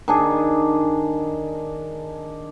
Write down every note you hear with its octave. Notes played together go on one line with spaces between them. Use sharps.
D#3 D4 G#4